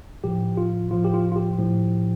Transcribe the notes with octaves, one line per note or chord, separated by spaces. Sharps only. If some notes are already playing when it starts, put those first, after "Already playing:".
A2 F3 G4
F4
A2 F3 F4
G4
F4
F4
G4
A2 F3